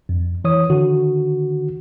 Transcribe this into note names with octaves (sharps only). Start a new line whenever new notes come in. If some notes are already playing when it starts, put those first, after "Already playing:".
F2
E3 C#5 D#6
D3 D#3 F#4